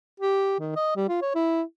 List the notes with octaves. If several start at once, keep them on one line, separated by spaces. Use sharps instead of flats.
G4
D#3
D#5
G3
F4
C#5
E4